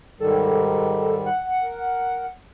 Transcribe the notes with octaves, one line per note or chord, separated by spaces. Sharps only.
G#2 D#3 G3 A4
F#5
A#4